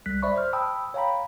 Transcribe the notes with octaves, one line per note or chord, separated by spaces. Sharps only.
C2 G3 F#6 B6
C5 D5 E5 B5 C#6
C5 F6
G5 A5 B5 D#6 E6
C#5 F5 G5 A#5 B5